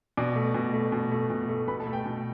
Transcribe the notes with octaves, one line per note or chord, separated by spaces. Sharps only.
B2 D5 D6
A3
B2
A3
B2
A3
B2
A3
B2 B4 B5
A4 A5
A3
G5
B2